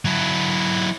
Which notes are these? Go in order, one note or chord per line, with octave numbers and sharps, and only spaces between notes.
F#3 E4